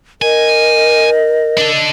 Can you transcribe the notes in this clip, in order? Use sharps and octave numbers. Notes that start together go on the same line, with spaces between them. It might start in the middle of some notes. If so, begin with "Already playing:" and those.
A#4 D#5 G#5
D4 A4